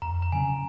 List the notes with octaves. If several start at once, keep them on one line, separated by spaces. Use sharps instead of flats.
F2 A#5
A#5
C#3 F#3 C#4 G#5